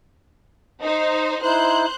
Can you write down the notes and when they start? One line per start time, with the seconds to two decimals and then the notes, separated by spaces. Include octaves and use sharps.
0.82 D#4 C5 D#5
1.42 D#4 E4 C5 F#6 G6